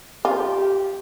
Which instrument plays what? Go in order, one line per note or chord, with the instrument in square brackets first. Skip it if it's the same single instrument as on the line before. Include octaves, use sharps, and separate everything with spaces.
[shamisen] F4 [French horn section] G4